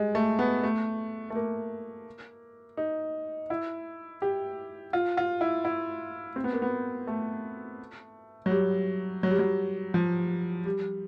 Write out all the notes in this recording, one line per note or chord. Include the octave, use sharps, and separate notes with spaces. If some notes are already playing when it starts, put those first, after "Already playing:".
Already playing: G3 G#3
A3
B3
A3
A3
A#3
D#4
E4
G4
F4
F4
E4
E4
C4
B3
A#3
B3
A3
F#3
G3
F#3
G3
F#3
F3
G3